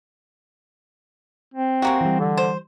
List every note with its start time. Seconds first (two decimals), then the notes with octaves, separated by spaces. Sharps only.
1.54 C4
1.82 G#3 A#3 F#4 G4 C#6
2.01 E3 G3
2.20 D3
2.37 C5